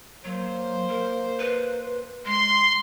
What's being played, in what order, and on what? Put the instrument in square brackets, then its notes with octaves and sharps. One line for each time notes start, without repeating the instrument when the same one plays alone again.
[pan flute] F#3 [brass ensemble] A#3 C5
[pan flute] A#4
B4
[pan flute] G#3 [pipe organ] C6